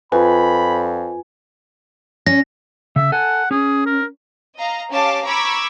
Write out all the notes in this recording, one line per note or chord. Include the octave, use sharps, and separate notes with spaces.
F2 F4 B4 G#5 B5
C#4 A#6
C#3 E5
A4 F#5 G#5
C#4 G#4
A#4
D#5 F5 A#5
C#4 G4 F5 A5 D6
A#5 B5 C#6 D6 E6 G#6